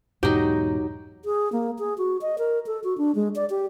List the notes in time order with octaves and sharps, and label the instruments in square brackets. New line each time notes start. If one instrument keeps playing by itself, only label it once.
[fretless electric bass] E2 G#2 B2 [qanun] F#3 D#4 [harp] G4
[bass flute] G#4
A#3
G#4
F#4
D#5
A#4
A4
F#4
D4
G#3
D5
G4